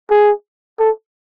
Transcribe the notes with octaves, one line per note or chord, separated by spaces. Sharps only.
G#4
A4